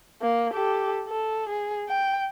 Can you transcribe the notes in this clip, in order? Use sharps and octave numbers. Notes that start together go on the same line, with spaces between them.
A#3
G4 A4
A4
G#4
G5